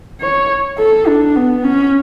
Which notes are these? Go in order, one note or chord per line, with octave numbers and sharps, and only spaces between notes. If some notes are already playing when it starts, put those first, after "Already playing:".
C#5
A4
D4
B3
C#4